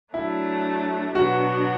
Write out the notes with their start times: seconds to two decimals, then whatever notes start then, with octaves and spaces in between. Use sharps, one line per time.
0.14 F#3 A3 D4 E4
1.15 B2 F#3 B3 D4 F#4